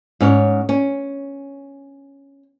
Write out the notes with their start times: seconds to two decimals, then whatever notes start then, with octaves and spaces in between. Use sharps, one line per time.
0.21 G#2 C#4 C#5
0.69 C#4